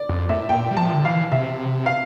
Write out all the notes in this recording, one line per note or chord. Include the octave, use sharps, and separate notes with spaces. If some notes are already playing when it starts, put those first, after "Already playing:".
Already playing: D5
F2
A2 E5
A#2 G5
G3
F3 A5
D3
E3 F5
C3 E5
F5